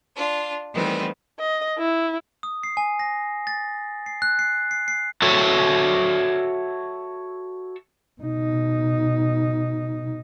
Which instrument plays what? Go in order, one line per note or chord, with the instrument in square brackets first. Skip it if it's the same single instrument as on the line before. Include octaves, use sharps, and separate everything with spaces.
[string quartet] D4 F4
D#3 E3 G3 A3 B3 C4
[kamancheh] D#5
E4
[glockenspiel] D#6
C7
G#5
A#6
A6
C7
F#6
C7
C7
C7
[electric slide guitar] F#4 A4 C#5 E5
[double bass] B2 D#4